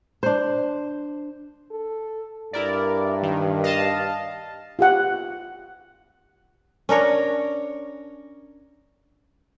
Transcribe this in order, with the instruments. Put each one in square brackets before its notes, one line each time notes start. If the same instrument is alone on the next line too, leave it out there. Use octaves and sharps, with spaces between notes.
[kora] D4 C5
[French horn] A4
[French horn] G2 [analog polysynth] E4 A#4 D5
[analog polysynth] D#3
D#5 F5 A5
[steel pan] F4 G4 F#5
[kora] C#4 D4 A#4 C#5